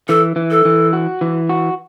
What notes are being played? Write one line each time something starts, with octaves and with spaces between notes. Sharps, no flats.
E3 A4
E3
A4
E3
F#4
E3
F#4